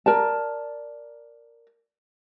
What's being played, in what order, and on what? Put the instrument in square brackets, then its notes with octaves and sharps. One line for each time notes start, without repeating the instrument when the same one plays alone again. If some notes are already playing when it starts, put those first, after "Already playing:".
[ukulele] A#4 D5 A5